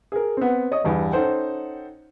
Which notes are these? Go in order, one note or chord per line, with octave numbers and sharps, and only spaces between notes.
G#4 A#4
B3 C4
C#5 D#5 D#6
E2 G2 G3
C#4 D#4 A4 C5 F#5 G5